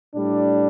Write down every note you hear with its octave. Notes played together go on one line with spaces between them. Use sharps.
A2 G3 D4